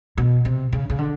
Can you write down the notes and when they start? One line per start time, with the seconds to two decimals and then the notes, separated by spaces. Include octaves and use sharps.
0.17 B2
0.45 C3
0.73 C#3
0.90 C#3
0.98 D3